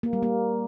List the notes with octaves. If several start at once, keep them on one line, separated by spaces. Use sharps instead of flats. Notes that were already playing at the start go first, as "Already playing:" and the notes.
A#3
G3
A#3